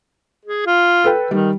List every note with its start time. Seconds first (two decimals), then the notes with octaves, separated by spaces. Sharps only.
0.45 G#4
0.66 F4
1.04 A4 B4 G5
1.31 D#3 G3